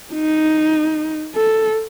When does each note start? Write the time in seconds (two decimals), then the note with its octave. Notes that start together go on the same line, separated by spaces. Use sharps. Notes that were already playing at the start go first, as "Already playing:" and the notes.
0.14 D#4
1.35 A4